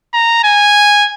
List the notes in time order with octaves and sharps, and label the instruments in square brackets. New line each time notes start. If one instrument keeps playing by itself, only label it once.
[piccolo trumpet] A#5
G#5